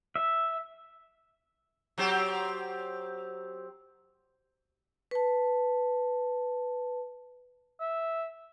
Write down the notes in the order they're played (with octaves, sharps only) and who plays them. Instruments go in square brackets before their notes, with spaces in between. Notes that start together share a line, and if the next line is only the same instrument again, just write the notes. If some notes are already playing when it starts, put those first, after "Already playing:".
[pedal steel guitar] E5
[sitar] F#3 C4 G4
[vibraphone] B4 A5
[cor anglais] E5